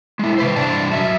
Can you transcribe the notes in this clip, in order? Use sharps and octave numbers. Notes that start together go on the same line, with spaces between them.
G#3 E4
C3 B4 C5
G2 C3 D4 D5 A5
F#3 E5